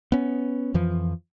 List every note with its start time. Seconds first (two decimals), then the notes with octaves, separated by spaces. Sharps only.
0.12 B3 C#4
0.74 F2 E3 F3